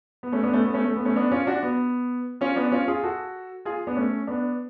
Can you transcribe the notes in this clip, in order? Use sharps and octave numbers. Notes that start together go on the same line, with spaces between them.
B3
A3 C#4
B3 D4
A3 C#4
B3
A3 C#4
A3
B3
A3 C#4
B3 D4
C#4 F4
D4 F#4
B3
C#4 F4
B3 D4
C#4 F4
F4 G#4
F#4 A4
F4 G#4
B3 D4
A3 C#4
B3 D4